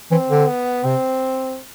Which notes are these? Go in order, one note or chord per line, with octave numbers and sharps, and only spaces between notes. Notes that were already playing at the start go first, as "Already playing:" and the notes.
E3 C4
D3
B3
C3 C4